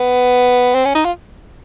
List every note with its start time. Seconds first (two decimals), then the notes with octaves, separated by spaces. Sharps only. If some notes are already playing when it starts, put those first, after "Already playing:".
Already playing: B3
0.75 C4
0.85 C#4
0.95 D#4
1.05 F4